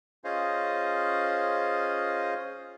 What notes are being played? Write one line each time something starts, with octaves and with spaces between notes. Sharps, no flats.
C#4 F4 G#4 C5 D#5 F5